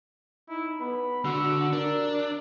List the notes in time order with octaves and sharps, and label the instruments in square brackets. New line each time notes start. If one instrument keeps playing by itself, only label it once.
[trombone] D#4 [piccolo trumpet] E4
[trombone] B3 [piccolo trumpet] B5
[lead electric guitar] D3 [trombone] F#4 [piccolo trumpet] E6
[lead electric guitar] D4 [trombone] A#4